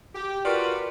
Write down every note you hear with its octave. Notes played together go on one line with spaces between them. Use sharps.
G4
F4 F#4 A#4 B4 D5